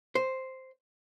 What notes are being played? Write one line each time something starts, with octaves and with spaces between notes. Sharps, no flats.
C5